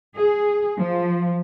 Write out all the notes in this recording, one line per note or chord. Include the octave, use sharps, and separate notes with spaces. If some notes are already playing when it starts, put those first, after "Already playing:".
G#4
F3